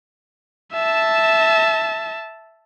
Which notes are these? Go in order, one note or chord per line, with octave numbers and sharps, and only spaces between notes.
E5 A5